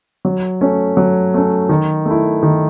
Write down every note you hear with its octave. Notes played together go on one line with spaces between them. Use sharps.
F#3
A3 C#4
F#3
A3 C#4
D#3
A3 E4
D#3